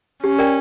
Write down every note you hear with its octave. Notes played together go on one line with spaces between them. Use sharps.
C#4 G4
A#4 D5 G5